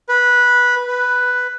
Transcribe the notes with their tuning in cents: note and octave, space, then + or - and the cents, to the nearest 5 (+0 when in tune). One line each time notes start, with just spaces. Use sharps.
B4 -10
B4 +5